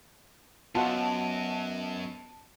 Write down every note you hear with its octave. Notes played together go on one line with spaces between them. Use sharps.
F#2 B3 F4 F#4 D#5 F#5 A5